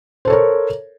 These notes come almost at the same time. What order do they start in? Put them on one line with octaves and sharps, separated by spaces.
C5 A4 C#5 A#4